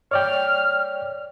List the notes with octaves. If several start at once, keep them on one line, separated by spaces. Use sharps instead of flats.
C#5 D5 G5 F6